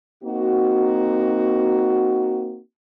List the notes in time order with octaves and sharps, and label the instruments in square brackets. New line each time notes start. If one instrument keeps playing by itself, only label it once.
[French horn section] A#3 C4 D#4 F#4